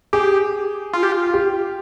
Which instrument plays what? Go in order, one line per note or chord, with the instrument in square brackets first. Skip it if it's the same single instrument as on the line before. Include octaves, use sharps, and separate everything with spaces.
[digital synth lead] G4 [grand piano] G#4
[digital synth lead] F4
G4
F4
[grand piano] G4